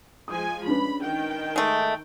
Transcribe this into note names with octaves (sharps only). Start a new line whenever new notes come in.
F3 G#3 G#5 D#6
C#4 D4 B4 B5
D#3 G5
G#3 A3